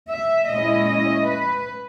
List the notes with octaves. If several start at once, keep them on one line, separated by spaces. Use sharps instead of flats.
E5
A#2 G#3 C#4 E4 D#5
D#5
B4